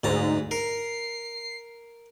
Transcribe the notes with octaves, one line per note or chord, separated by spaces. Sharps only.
D2 G#2 A5 A#5
A#4 C7